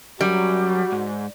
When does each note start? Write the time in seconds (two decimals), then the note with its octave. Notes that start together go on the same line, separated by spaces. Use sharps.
0.21 F#2 F#3 G3 F#4
0.92 G#2